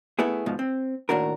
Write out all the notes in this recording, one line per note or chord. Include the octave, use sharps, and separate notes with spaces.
A3 B3 E4 G#4
G#2 B2 F3
C4
D#2 A2 D4 F#4 A#4